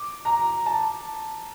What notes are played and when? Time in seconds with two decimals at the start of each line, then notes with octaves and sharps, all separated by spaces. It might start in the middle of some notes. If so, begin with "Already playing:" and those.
Already playing: D6
0.25 A#5
0.66 A5